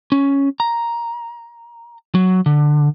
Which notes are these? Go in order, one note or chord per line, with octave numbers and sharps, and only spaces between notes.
C#4
A#5
F#3
D3